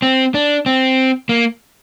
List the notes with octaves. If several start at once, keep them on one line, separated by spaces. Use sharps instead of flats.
C4
D4
C4
A#3